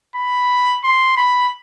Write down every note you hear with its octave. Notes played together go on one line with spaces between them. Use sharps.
B5
C6
B5